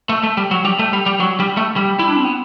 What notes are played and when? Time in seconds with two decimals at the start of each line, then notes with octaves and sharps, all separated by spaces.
0.10 A3
0.23 A3
0.37 G3
0.51 F#3
0.65 G3
0.79 A3
0.93 G3
1.06 G3
1.20 F#3
1.40 G3
1.57 A3
1.76 G3
1.99 E4
2.08 D4
2.16 C4
2.24 B3